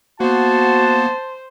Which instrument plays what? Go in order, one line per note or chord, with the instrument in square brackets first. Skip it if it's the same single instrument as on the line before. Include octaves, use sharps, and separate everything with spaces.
[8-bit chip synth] A#3 B3 [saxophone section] F#4 [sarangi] C5 [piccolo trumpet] A5